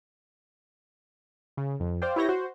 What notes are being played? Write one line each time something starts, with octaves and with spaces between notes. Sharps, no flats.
C#3
F2
C5 D5 F5 G5
E4 G4 B4 C#5 G6 A#6
F#4 C5